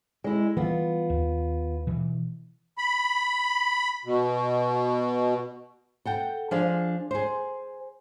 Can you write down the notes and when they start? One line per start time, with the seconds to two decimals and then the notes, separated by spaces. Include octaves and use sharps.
0.24 G#3 E4
0.57 E3 G3 B3 F4
1.10 D#2
1.87 B2 E3
2.78 B5
4.05 B2
6.05 A4 F#5 G5
6.51 F3 D4 G#4 F5
7.11 G#4 C5